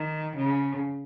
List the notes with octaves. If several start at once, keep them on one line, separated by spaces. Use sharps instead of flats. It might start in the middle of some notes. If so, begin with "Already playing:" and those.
Already playing: D#3
C#3